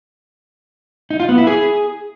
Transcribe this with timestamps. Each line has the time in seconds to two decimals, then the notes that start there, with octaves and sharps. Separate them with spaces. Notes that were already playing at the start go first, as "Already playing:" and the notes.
1.10 D#4
1.20 F4
1.29 B3
1.38 E4
1.47 G#4